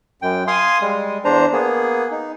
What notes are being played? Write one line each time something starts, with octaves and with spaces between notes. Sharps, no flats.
F#2 G5
F5 G#5 C6 D#6
G3 G#3
E2 D4 C5 A#5
A#3 B3 G#4
D#4